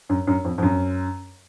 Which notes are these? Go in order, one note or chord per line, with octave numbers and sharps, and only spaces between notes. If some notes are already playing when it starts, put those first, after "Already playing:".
F#2
F#2
F2
F2
F#2